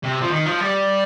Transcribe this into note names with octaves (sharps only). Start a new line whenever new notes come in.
C3
F3
D#3
F3
G3